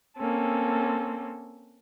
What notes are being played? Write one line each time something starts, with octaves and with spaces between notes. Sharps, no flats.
A#3 C4 C#4 A4